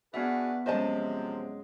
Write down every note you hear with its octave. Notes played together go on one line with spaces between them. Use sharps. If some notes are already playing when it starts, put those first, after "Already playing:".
B3 D4 F#4 G#4 B4 E5
F#2 C3 F3 G#3 C5 D#5 A5